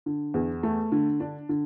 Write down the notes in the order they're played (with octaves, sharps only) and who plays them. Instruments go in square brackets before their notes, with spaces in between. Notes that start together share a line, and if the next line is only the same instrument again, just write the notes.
[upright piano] D3
E2
A3
D3
D4
D3